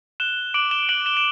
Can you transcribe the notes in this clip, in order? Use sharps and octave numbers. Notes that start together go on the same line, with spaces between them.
F#6 E7 G7
D6 D7 F#7
E7 G7
F#6 D7 F#7
E7 G7
E7